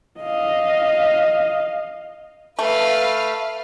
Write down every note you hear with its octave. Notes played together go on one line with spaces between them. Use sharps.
D#5 F5
A3 B4 F5